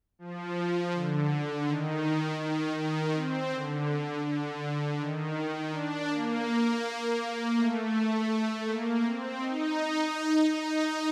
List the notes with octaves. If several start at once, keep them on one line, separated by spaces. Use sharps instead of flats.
F3
D3
D#3
D#3
D#3
C4
D3
D3
D#3
D4
A#3
A3
A#3
C4
D#4
D#4